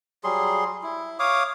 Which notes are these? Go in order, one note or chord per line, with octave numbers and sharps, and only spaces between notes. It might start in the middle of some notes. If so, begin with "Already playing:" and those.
F#3 G3 G#4 C6
E4
C#5 F5 D6 D#6